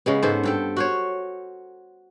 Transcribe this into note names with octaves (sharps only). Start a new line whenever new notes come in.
C#3 G#3 B3
G#2 B3 A4 C5
G2 A4 G5
F#4 C5 C#5